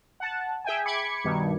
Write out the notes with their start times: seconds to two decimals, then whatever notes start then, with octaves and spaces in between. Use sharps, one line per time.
0.20 F#5 A5
0.65 G#4 E5 G5 G#5
0.85 B5 D6 G#6 C#7
1.24 G2 B2 D#3